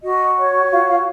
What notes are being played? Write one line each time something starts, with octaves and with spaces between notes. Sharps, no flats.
F#4 D#5
C#5
F4 F#4 F5
F4 F5